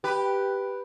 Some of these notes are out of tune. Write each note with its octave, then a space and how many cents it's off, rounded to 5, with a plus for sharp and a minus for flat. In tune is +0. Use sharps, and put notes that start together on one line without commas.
G4 +0 B4 +0